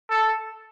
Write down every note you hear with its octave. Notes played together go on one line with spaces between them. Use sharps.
A4